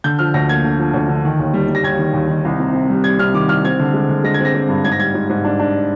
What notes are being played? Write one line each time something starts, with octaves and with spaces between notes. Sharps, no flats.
D3 G6
F3 F6
D2 A#6
A#3 G#6
D3
F3
D2
D3
D#3
D#2
G3
G3
A#6
D#2 G#6
D#3
D#2
D#3
C2
C3
C3
G3
G3 G#6
C3 F6
D#3 D6
C2 F6
C4 G#6
D3
G#3
D3
G#3 A#6
G#6
C4
A#6
C4
G2
G#2 G#6
A#6
G3 G#6
G#2
G#2
D4
D4